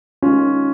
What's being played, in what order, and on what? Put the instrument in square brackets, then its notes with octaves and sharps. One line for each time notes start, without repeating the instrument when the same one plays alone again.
[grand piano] D#3 G#3 C#4 F4